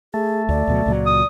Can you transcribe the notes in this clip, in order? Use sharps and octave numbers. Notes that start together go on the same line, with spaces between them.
A3 G#4
D2 D5
D2 B2 F#3
C#2 A#2 F#3
D#6